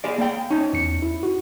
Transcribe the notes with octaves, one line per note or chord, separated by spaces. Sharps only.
G#4 D5
A#3 G5
C#4 D#4
E2 C#7
E4
F#4